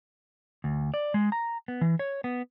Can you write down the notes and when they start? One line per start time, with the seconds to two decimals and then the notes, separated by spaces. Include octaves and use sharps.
0.64 D2
0.94 D5
1.14 G#3
1.32 A#5
1.68 B3
1.81 E3
1.99 C#5
2.24 B3